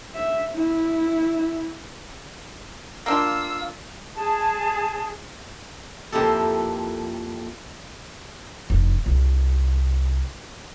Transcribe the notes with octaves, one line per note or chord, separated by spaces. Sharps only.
E5
E4
A#3 D4 F4 F5 E6
G#4 A5
F2 A#3 E4 G4 A4
F1
C2